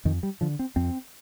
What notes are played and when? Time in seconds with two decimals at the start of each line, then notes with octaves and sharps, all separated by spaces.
0.05 F2 D#3
0.23 G3
0.41 D3 F3
0.59 C4
0.76 F2 C4